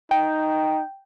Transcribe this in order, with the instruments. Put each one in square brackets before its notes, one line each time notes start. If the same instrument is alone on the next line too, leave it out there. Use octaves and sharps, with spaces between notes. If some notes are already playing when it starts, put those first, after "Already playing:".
[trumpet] D#4 [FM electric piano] G5